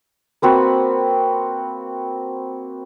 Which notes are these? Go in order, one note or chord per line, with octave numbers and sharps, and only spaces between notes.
A#3 C4 F#4 B4